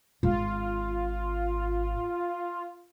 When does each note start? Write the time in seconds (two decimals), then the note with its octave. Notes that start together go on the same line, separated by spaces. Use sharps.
0.23 G#1 F4